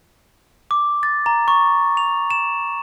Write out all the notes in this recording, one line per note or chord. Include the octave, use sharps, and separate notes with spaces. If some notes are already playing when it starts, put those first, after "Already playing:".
D6
A6
A#5
C#6
F7
E7